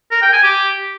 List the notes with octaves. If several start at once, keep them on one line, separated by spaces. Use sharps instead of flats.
A#4
G5
G#5
G4